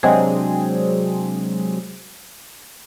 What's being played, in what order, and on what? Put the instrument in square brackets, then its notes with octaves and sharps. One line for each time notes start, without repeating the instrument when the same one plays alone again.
[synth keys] C3 F#3 G#3 C4 D4 G#4